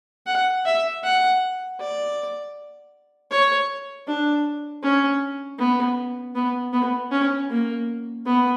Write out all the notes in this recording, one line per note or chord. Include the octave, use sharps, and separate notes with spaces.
F#5
E5
F#5
D5
C#5
D4
C#4
B3
B3
B3
C#4
A#3
B3